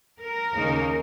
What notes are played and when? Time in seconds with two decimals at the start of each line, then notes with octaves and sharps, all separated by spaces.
0.20 A#4
0.55 D#2 C#3 A#3 D#4